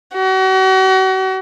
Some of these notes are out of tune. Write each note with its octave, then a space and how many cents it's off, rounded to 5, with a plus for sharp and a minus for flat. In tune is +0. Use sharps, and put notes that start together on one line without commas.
F#4 +40